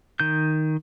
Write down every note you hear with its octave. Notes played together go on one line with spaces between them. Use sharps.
D#3 G6